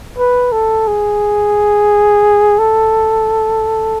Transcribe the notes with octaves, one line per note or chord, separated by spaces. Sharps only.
B4
A4
G#4
A4